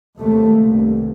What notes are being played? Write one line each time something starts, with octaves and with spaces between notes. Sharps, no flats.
D#2 C3 A3
C2 G2